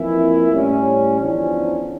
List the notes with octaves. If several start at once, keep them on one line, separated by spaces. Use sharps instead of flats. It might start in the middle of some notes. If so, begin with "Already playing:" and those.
Already playing: F2 E3 A#3 E4
A2 G3 C#4
E2 D3 F3 C#4